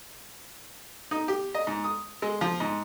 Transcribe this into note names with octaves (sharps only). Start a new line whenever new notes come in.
D#4
G4
D#5
G#2
D#6
G#3
F3
G#2